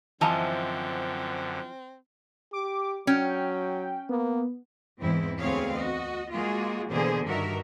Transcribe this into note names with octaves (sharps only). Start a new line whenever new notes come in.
F#2 D3 E3 F3 C4 D#5 A5 A#5
G4 D6
F#3 C#4 G5
A#3 B3
E2 G#2 E3 C4 E4
D2 B3 C4 G#4 C#5 F5
F#4 D#5
G#3 A#3 F4 F#4 G#4
B2 D3 E3 A#3 G#4 C5
G2 D#3 F#4 A#4 E5